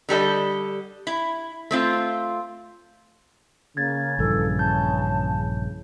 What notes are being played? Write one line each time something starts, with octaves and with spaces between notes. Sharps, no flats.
D3 G3 A4 D#5
E4
A3 C4 F4
C#3 A#3 G#6 A6
A#1 G2 E3 A4
A5 G6